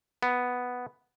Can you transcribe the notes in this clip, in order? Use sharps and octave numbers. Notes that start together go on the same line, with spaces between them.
B3